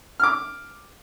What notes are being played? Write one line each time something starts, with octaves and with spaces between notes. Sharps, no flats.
D6 F6